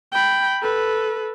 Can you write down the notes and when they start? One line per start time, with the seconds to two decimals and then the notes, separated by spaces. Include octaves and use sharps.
0.12 G5 B5
0.62 A4 B4